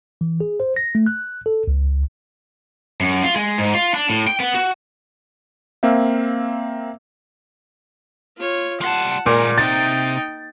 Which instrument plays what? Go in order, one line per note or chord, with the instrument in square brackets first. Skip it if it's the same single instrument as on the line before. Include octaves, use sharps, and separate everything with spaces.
[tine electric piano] E3
G#4
C5
A#6
A3
F#6
A4
C#2
[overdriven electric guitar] F#2
F4
G#3
G#2
F4
D4
A2
G5
B3
F#4
[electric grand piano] A#3 C4 E5 F5
[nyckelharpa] F4 C#5
[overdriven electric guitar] G3 C6 [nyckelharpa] F#5 A5
[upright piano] A#2 [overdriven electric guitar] G#3 A#4 [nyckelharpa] A#3
[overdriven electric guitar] C3 [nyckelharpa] D#4 G5 [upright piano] A6